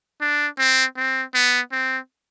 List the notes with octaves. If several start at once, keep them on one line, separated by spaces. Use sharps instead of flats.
D4
C4
C4
B3
C4